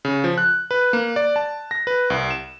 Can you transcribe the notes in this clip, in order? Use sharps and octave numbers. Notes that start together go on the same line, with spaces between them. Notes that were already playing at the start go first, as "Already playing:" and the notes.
C#3
F3
F#6
B4
A#3
D5
A5
A#6
B4
C2
E7